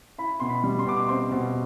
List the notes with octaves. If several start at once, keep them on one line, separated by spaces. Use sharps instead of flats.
E4 B5
B2 C6
B5
G3
C6
B2 D6
C6
C4 C6
B2